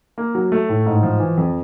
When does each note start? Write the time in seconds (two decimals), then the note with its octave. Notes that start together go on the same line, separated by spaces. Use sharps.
0.18 A#3
0.35 F#3
0.52 A3
0.69 A2
0.86 G#2
1.03 F3
1.20 E3
1.37 F2